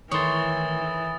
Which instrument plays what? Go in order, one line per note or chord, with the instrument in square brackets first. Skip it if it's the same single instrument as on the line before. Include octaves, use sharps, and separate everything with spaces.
[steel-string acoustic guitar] A2 D#3 [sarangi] E3 [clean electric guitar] C#5 C6 [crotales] D#6 A6